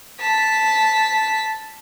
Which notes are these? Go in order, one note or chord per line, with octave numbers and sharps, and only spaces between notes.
A5 B6